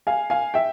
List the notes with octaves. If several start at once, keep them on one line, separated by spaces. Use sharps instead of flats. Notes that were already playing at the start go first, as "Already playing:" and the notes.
F5 G#5
F5 G#5
E5 G5